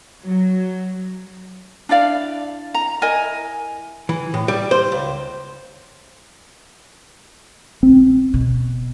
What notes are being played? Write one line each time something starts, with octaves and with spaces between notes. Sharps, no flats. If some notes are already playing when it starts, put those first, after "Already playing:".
F#3
D4 E4 D5 F5
A#5
E4 A#4 D#5 G#5
E3
A2
G3
C5
C#2
A#1 C4
B2